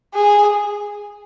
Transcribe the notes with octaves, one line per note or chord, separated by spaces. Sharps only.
G#4